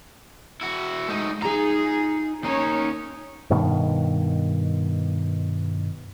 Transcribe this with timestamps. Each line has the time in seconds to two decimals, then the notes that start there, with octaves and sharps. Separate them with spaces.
0.61 E4 F#4
1.09 G#3 A3 D#4
1.42 D#4 F4 G#4 A#5
2.44 A#3 C#4 D#4 C#5
3.50 G2 B2 D#3